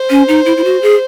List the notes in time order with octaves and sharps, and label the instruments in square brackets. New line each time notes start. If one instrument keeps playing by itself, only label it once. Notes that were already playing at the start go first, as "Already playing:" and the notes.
Already playing: [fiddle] C5
[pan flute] C#4
D#4
E4
E4
F#4
G#4